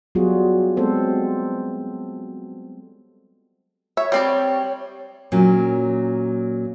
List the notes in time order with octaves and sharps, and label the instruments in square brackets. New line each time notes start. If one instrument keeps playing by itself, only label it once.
[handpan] F#3 G3 B3 F4 F#4 G#4
G#3 B3 C4 A4 C5
[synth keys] C#5 [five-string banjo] E5
[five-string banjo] G3 C4 D5
[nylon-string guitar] A#2 F#3 C#4